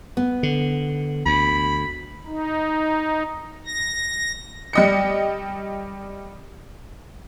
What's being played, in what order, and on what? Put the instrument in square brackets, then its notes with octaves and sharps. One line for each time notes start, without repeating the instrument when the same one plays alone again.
[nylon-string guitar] B3
[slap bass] D3
[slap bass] D2 [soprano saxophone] B5
[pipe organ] D#4
A#6
[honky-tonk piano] G3 D#5 C#7